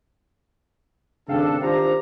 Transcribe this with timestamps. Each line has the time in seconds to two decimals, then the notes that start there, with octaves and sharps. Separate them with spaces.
1.28 G#1 C#3 D4 A4 F5 G5
1.62 D#3 D4 F4 G4 C5 F5 A#5